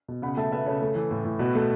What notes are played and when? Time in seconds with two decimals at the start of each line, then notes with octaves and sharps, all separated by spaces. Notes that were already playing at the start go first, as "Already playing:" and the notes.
0.08 B2
0.22 C#3 F#5 B5
0.37 A3 E5 A5
0.52 A3 B4 E5
0.66 C#3 A4 C#5
0.82 A3
0.95 E3
1.11 A2
1.25 A2
1.39 B2 F#4 B4
1.55 A3